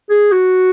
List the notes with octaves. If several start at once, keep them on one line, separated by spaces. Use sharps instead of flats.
G#4
F#4